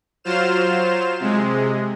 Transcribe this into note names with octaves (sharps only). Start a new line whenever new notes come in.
F#3 F4 C5 F6 E7
C3 G#3